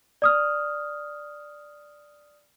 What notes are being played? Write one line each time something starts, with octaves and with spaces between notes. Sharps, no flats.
D5 D#6 F6